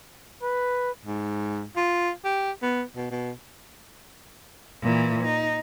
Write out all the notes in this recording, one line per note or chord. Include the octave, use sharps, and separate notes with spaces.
B4
G#2
F4
G4
B3
B2
B2
A#2 E3
D#4